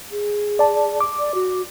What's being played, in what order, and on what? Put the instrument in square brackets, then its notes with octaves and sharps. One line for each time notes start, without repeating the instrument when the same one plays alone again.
[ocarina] G#4
[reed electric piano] D5 A5
D6
[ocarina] D5
F#4